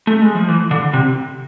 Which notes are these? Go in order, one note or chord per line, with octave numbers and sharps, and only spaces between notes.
A3
G#3
F3
E3
D3
C3